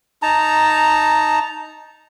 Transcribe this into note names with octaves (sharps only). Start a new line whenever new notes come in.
D#4 A5 A#5